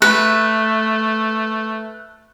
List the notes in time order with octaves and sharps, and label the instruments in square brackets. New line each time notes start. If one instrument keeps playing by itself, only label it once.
[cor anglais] A3 [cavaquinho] B4